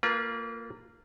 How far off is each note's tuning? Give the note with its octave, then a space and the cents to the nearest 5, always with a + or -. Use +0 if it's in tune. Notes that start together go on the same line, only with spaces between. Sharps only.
A#3 -20 F4 +0 B4 -40